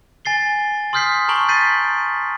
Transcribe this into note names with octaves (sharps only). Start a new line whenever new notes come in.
G#5 A6 C7 G7
C6 D#6 F6 G6 B6 C7
A5 A#5 C#6 D7 F#7 G7
G6 A6 B6 C7 D#7